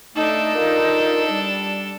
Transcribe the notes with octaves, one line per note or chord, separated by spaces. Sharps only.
A3 D4 D#4 A4
F4 A#4
G3